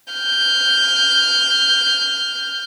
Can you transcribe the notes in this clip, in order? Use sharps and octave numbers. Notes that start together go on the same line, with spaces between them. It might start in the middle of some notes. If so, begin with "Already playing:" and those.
F6 G6